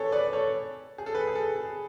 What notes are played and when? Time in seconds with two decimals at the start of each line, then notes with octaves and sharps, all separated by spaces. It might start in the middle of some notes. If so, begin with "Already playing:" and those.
Already playing: G#4 A4 B4 C#5
0.12 B4 D5
0.33 A4 C#5
0.98 G#4
1.06 A4
1.15 G#4 B4
1.28 G#4
1.35 A4
1.56 G#4